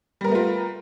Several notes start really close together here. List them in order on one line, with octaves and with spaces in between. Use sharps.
G3 A#4 B3 A3 F4